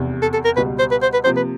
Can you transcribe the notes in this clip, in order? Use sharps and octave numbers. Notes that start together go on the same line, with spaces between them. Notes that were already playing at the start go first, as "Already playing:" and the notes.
Already playing: F1 E2 C3
A4
A4
A#4
C#2 B2 G3 B4
C5
B4
C5
B4
C3 F3 A#3 C5
B4